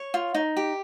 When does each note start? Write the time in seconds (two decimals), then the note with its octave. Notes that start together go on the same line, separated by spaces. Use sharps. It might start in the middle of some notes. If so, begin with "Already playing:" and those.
Already playing: C#5
0.14 F4
0.34 D#4
0.57 G4